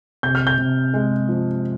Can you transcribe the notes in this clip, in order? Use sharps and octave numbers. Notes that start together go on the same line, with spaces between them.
C3 G6
F6
G6
C3
G#3
F3